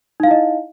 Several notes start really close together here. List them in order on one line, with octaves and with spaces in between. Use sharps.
D#4 F5 E4 D#5